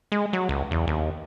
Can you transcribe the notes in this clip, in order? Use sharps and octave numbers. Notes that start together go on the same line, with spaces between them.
G#3
F#3
C#2
E2
D#2